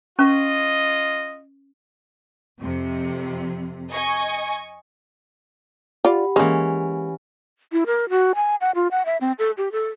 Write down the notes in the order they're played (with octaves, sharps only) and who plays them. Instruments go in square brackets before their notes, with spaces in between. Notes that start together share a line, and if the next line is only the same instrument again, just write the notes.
[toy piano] C#4 B4 C#6 [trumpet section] F4 D#5
[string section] F2 C3
D#5 G#5 C#6
[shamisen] F4 D5 [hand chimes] G4 F#5 B5
[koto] E3 C#4 [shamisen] G#3 A#3
[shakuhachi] E4
A#4
F#4
G#5
F#5
F4
F#5
E5
C4
A4
G4
A4